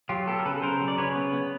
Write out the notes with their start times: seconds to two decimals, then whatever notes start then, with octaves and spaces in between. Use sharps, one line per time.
0.09 F#3 F4 G4
0.27 B3 G4 A4
0.39 A#4
0.45 C#3 A4 B4
0.62 C#3 A#4 C5
0.81 F#3
0.88 D5
0.98 C#3 B4 C#5
1.15 B3
1.33 B3